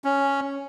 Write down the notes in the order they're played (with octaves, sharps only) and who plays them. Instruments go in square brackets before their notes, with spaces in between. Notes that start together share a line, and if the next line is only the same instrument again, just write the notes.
[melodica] C#4